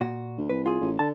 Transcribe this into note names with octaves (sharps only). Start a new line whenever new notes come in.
A#2 F#4
D2
C2 B4
F4 G#4
A1
D3 A5